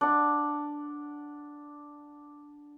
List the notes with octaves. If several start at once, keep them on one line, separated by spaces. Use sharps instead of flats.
D4 F#5